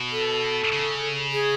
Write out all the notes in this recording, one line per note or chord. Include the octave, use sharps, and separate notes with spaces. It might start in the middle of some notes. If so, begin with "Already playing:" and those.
Already playing: B2
A4
C#3
G#4